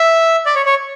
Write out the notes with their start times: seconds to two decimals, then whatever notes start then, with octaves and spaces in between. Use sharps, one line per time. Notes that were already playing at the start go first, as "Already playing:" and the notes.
Already playing: E5
0.46 D5
0.56 C#5
0.66 C#5